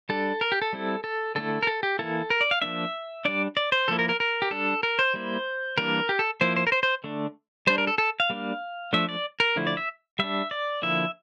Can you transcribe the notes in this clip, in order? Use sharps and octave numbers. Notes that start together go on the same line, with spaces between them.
G3 D4 A4
A#4
G4
A4
G3 C4 E4
A4
D3 A3 E4 A4
A#4
A4
G4
E3 A#3 E4 A4
A#4
D5
F5
F3 A#3 D4 E5
G3 D4 D5
D5
C5
F3 A#3 E4 A4
A#4
A#4
A#4
G4
G3 D4 A4
A#4
C5
G3 A#3 E4
E3 G3 A#3 D4 A#4
G4
A4
F3 A#3 E4 C5
C5
A#4
C5
C5
D3 A3 D4
G3 D4 C5
A#4
A4
A4
F5
G3 A#3 D4
F3 A3 D4 E5
D5
A#4
D3 F3 A3 E4
D5
E5
G3 D4 E5
D5
D3 F3 A#3 E4 E5